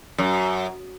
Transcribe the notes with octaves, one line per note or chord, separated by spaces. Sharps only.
F#2